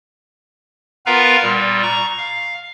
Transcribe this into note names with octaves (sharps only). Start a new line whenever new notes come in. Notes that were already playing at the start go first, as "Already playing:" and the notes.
B3 F4 A#4 B4 F5 A#5
A#2 G3
A#5 C#6
F5